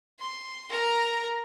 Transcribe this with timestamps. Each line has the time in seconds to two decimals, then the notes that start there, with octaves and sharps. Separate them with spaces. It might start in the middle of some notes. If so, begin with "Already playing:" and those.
0.19 C6
0.70 A#4 A#5